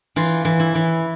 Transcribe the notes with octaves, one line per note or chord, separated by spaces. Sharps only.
E3 F4
E3
E4
E3